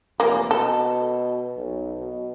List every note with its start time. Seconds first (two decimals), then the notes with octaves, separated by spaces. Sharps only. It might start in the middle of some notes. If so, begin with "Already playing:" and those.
0.20 F1 E3 A#3
0.51 B2 A4
1.57 B1
1.99 B2